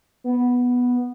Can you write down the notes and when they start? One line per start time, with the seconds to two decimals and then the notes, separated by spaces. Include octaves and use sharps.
0.24 B3